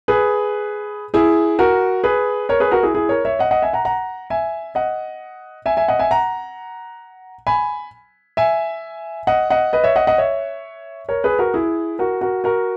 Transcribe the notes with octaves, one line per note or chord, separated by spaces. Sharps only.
G#4 B4
E4 G#4
F#4 A#4
G#4 B4
A#4 C#5
G#4 B4
F#4 A#4
E4 G#4
E4 G#4
A#4 C#5
C#5 E5
D#5 F#5
D#5 F#5
E5 G#5
F#5 A#5
F#5 A#5
E5 G#5
D#5 F#5
E5 G#5
E5 G#5
D#5 F#5
E5 G#5
F#5 A#5
G#5 B5
E5 G#5
D#5 F#5
D#5 F#5
B4 D#5
C#5 E5
D#5 F#5
D#5 F#5
C#5 E5
A#4 C#5
G#4 B4
F#4 A#4
E4 G#4
F#4 A#4
F#4 A#4
F#4 A#4